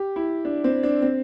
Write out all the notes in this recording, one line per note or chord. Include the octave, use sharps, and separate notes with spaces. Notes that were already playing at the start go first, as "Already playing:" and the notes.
Already playing: G4
E4
D4
C4
D4
C4